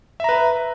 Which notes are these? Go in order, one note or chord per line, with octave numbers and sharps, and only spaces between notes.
B4 E5 A#5